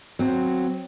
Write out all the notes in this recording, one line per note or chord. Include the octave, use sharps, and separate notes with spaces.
F#3 C4